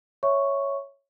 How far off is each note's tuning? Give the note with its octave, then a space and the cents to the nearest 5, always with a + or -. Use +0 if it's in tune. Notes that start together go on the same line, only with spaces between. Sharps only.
C#5 +0 E5 +0 C#6 +0